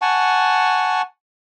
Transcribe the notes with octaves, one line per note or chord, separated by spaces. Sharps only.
F#5 G#5 A5 C#6